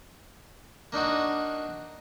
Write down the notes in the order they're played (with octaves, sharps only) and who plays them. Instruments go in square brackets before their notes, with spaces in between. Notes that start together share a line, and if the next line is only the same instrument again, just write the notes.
[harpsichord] A#3 D4 D#4 F#4